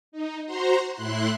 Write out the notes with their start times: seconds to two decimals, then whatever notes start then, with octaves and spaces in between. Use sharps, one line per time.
0.12 D#4
0.46 F#4 C5 A#5 C6
0.93 A2 E4 C6 F#6